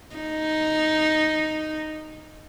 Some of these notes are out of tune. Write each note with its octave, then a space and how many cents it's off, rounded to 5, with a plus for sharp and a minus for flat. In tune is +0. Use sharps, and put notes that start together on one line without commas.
D#4 +0